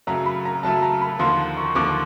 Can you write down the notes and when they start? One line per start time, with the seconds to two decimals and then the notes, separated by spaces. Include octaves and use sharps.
0.07 F#2 C#3 F#3 A3 A#5
0.26 B5
0.45 A#5
0.63 F#2 C#3 F#3 A3 A5
0.82 A#5
1.01 B5
1.19 D#2 D3 F3 A#3 C6
1.57 C#6
1.75 D#2 D3 F3 A#3 D6